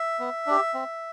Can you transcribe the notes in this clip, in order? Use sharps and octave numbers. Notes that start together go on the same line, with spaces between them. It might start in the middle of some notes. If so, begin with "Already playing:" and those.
Already playing: E5
B3
D4 G4
C4